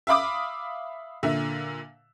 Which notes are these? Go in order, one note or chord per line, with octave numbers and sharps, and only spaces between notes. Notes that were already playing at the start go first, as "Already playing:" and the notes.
E5 F5 B5 D6 D#6
A#2 D3 E5